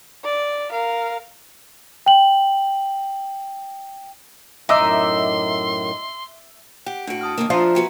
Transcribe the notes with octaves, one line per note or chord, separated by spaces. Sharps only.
D5
A#4 F5
G5 F#7
F#2 A2 D#4 E5 C6 D6 E6
G4 F#5
A2 D4 F#4 D7
A5 D#6 F6
D#2 G#2 A#3
F3 D4 F4 E5 A#5
B3 F#4 G#5